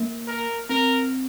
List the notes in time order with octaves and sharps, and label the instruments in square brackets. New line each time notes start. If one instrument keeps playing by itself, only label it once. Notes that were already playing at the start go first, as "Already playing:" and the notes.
Already playing: [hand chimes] A#3
[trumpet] A#4
[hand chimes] C4 [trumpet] A#4